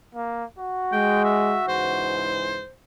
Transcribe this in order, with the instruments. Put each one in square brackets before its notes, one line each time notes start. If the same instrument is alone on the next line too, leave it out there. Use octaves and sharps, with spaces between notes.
[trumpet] A#3
F#4
[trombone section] G#3 [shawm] G5
[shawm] E5
[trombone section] C#2 G#2 E3 [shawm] C5